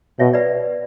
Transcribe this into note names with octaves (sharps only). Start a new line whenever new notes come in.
B2 C#5 E5
B4 D5